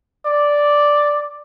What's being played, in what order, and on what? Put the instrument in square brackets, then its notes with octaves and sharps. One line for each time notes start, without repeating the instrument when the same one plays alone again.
[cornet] D5